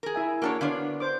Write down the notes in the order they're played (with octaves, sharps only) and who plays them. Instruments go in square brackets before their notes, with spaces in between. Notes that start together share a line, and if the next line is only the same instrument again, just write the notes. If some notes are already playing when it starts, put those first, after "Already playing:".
[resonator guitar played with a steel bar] G#4 A#4
[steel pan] E4 E5 G#5
[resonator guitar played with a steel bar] A#3 D4 C#5 [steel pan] F#4 A#4 A5
[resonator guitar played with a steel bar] D3 B3 D4 [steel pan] C#5 F5
[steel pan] C5 D6